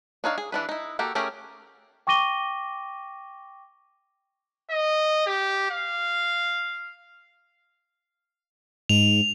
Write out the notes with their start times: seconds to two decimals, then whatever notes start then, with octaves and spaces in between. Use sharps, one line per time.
0.24 D4 D#4 C#5 F5
0.38 G#4
0.52 E3 D4 B4
0.69 D#4 E4
0.99 A#3 F#4 G4 A4
1.15 A3 C#4 G4 G#4 A#4
2.07 G5 C#6 D6 A#6 D#7 G7
4.70 D#5
5.27 G4
5.71 F5
8.89 G#2 F7